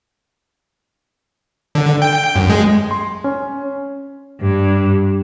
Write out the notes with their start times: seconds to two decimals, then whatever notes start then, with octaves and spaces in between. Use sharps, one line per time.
1.75 D3
2.02 G5
2.36 F#2
2.50 G#3
2.91 C6
3.24 C#4
4.41 G2